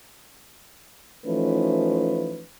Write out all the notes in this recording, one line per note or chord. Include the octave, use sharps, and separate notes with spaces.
E3 F3 A3 C#4 D#4 B4